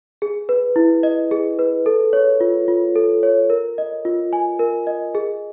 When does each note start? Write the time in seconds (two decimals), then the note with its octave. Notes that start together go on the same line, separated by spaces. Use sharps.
0.22 G#4
0.49 B4
0.76 E4
1.03 D#5
1.31 G#4
1.59 B4
1.86 A4
2.13 C#5
2.41 F4
2.68 F4
2.96 A4
3.23 C#5
3.50 A#4
3.78 D#5
4.05 F4
4.33 G#5
4.59 A#4
4.87 D#5
5.15 G#4